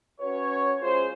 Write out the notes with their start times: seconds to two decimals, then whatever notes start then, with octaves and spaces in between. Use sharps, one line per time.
0.20 C#4 F#4 B4 C#5
0.81 G#3 C#4 F4 G#4 C5